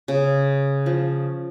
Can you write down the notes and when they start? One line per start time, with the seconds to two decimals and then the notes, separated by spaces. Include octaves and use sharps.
0.08 C#3
0.86 F3